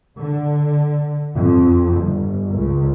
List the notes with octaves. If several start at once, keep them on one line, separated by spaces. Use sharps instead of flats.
D3
F2
G1
C#2